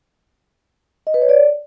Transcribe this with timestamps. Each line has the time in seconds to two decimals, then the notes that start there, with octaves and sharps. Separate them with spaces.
1.07 D#5
1.14 B4
1.22 C#5
1.29 D5